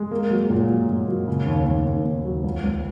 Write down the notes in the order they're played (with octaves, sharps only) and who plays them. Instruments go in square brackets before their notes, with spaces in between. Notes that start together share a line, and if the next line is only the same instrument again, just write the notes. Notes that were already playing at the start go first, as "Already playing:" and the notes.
Already playing: [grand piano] G#3
A#3
F#3
A#2
F#3
A#2
F#3
C#3
D#2
D#2
D#2
D#2
F#3
C#2
C#2